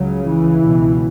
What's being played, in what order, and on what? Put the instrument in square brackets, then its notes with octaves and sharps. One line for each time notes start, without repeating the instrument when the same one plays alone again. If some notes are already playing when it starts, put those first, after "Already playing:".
Already playing: [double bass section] C#2 C#3 F#3
E3
C#2 B2